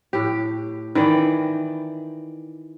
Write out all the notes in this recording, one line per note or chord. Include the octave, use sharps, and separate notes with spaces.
A2 G4
D#3 E3 D5 G5